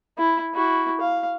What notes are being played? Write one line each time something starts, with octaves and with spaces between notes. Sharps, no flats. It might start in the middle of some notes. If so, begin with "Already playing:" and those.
E4
E4 F#4
F5